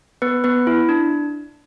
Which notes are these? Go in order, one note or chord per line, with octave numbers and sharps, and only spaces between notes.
B3 B4
B3 B4
E4
D4